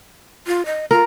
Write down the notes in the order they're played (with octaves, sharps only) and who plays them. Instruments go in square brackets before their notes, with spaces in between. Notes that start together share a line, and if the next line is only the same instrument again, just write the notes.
[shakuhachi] F4
D#5
[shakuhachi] F4 [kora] A#4